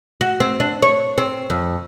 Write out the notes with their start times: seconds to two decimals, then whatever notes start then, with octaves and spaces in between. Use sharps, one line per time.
0.21 F#4
0.40 C4
0.60 D4
0.82 C#5
1.18 C4
1.50 F2